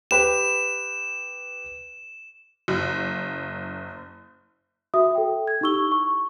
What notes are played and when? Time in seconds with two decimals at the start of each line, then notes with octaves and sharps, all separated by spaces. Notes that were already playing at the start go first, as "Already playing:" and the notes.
0.11 G4 B4 E7
2.68 F#1
4.94 F#4 E5 D#6
5.15 A4 G5
5.48 G#6
5.61 D#4 E4 G4 C#6 E6 G7
5.92 C#6